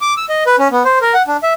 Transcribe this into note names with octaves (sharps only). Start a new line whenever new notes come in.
D6
E6
D#5
B4
C#4
B3
C5
A#4
F#5
D4
E5